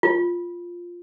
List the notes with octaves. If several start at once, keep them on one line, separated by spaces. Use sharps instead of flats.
F4